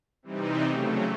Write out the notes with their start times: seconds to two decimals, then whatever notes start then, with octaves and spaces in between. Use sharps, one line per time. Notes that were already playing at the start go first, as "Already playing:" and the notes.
0.23 C3 E3 G3 C4 D#4
0.64 C#3 F#3 A3